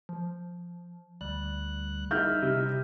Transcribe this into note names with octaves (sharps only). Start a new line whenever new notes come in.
F3
D2 G3 F#6
D#4 E4 D#5 E5 F6 G6
C3